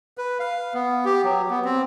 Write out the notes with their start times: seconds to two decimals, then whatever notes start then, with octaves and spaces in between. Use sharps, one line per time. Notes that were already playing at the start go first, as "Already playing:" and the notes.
0.18 B4
0.39 F5
0.74 B3
1.05 G4
1.24 F#3
1.50 B3
1.65 C4